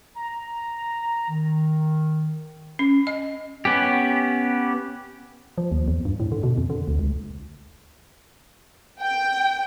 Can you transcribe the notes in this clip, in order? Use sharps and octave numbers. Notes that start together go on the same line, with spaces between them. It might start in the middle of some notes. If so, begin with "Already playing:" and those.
A#5
D#3
C#4
D#5
B3 C#4 G4
F3
D#2
E2
G2
A2
D3
B2
F2
D3
D2
C#2
G5